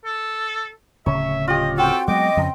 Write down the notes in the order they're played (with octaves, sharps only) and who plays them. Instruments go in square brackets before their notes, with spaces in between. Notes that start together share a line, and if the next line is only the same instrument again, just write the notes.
[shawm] A4
[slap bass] D1 C#3 [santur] C#5 [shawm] E5
[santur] F4 G4 [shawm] D#5
[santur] C4 F#4 [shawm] A4 [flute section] G5
[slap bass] F#3 G#3 B3 [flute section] D#5 [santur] G5 [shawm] D6
[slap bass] F2 C#3 F3